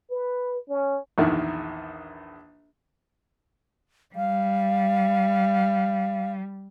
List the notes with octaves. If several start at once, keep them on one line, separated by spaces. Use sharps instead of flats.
B4
C#4
A#1 E2 D#3 E4
G3 F5